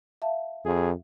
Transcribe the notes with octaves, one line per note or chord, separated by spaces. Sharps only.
E5 F5 A5
F2 G#4